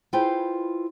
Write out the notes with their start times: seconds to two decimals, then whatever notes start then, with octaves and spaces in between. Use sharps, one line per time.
0.13 E4 F4 G#4 B4 C5 G5